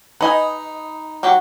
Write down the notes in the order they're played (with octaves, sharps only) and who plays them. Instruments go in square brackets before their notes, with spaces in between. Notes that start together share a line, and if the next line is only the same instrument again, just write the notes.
[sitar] D#4 [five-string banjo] B4 D#5 G#5
[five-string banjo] F#3 F#4 G4